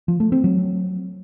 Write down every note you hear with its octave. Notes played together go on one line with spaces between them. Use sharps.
F3
A3
C4
F#3